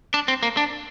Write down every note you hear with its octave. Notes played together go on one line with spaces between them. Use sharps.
D4
C4
A#3
D4